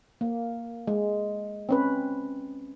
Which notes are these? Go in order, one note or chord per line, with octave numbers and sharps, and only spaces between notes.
A#3
G#3
C4 C#4 B4